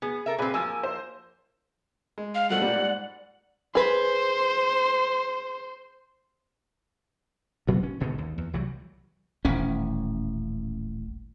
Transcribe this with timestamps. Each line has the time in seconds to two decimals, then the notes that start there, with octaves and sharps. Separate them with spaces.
0.02 B3 G#4
0.26 A4 A#4 E5
0.38 A#2 C4 G#4 B4
0.54 F3 A#3 G#5 E6
0.83 C5
2.18 G#3
2.35 F5
2.50 B2 F3 G3 A3 F#5
2.62 A#2 G3 D5
2.76 G#2
3.75 G#4 B4 C5
7.67 D2 A#2 F#3 B3
7.83 C#4
8.00 G#1 B2 D3 D#3
8.18 D#2
8.38 E2
8.53 C2 E3 F#3 G3
9.45 D#1 A1 C#4